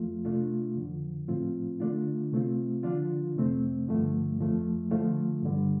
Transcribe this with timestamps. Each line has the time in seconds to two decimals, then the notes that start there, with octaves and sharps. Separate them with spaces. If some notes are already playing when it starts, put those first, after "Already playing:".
Already playing: F2 F3 A3 F4
0.25 C3 A3 D4 F4
0.76 F2 D3 F3
1.28 A2 F3 A3 C4 F4
1.80 D3 A3 D4 F4
2.32 C3 A3 C4 F4
2.83 D3 F3 D4 F4
3.36 F2 C3 A3 C4
3.87 G2 D3 F3 A3
4.39 F2 F3 A3
4.91 D3 F3 A3 F4
5.43 G2 D3 G3